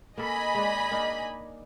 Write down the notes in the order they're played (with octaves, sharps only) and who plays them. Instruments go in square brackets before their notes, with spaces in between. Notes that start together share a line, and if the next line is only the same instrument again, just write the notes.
[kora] A#3 A4 [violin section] D#5 G#5 B5
[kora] G#3 D4
A#3 D4 D#4